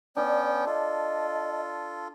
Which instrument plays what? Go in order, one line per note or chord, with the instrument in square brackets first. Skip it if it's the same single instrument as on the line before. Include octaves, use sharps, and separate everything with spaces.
[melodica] B3 C#4 G5 [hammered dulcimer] D4 [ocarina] D5
[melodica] F4 A4 [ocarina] D#5